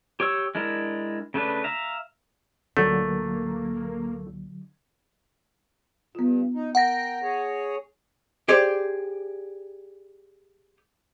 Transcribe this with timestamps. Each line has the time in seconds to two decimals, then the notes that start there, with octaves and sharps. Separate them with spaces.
0.20 G4 C#5 C#6 E6
0.55 G#3 D4 E4 A#4
1.34 C#3 A3 D4 B4
1.64 E5 F5 A#5
2.77 C#2 A#2 D3 F#3 A3 A#3
6.15 G2 B3 F4
6.54 D#4
6.75 A#4 F#5 G5 A#6
7.22 G#4 C#5
8.49 G4 G#4 C5 D5